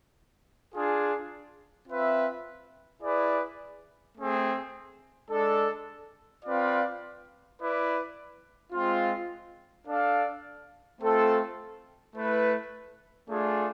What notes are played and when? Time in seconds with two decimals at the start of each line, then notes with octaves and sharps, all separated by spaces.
0.74 D4 F4 G#4
1.88 C4 F4 B4 E5
3.03 E4 G#4 B4 D5
4.17 A3 C4 G#4
5.30 G#3 D4 A4
6.45 C4 F4 B4 D5 F5
7.59 E4 B4 D5
8.73 G#3 C4 F4
9.87 D4 A4 D5 F5
11.01 A3 C4 F4 A4
12.15 A3 E4 B4
13.30 A3 D4 F4 G#4